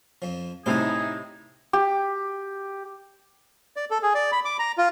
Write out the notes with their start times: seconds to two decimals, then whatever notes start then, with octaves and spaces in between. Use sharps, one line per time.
0.22 F2 F3
0.66 A2 C3 G3 D#4 E4 G#4 C5 G#5
1.73 G4
3.77 D5
3.91 A4
4.03 G#4
4.14 D5
4.32 B5
4.45 D6
4.59 A#5
4.78 F4